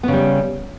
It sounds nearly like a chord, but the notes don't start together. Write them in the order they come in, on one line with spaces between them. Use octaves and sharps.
B3 C#3 G3